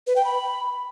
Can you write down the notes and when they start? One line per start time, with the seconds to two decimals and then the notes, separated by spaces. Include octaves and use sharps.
0.07 B4
0.16 G5
0.25 B5